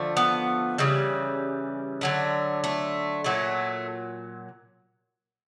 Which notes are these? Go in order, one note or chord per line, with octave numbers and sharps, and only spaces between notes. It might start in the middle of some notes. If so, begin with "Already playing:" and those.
Already playing: D3 F3 A3
B3
C#3 E3 G3
D3 F#3 A3
A3
A#2 F#3 A3